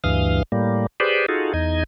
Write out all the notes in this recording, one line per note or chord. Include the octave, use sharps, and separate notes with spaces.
D2 G2 E3 F5 D#6 F6
A2 G3 A#3
G4 G#4 B4 C5 D5
D#4 F4 F#4 G#4 A4
E2 D#4 D#5 G#6